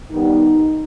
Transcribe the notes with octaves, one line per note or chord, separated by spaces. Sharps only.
D#3 G3 B3 D#4